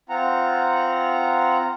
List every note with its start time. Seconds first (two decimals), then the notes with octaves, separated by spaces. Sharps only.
0.09 C4 F4 F#5 A#5